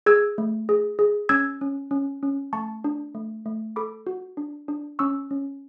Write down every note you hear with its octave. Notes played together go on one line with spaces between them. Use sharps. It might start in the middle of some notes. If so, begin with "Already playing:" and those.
G#4 E6 G#6
A3
G#4
G#4
C#4 E6 G#6
C#4
C#4
C#4
A3 A5 C#6
D4
A3
A3
A4 B5 D6
F#4
D4
D4
C#4 C#6 E6
C#4